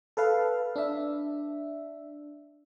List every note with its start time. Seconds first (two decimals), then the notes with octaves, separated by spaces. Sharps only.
0.17 A4 B4 F5
0.76 D4 E5